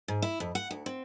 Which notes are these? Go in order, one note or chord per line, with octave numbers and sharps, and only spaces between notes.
G#2
E4
F2
F#5
D2
C4